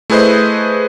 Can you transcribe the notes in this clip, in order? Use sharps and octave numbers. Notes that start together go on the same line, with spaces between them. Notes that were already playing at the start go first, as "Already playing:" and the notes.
A3 E4 G#4 B4 C5 D#5